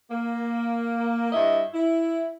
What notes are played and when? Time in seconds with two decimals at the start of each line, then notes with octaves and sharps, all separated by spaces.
0.10 A#3
1.32 G2 E4 D#5 E5
1.73 E4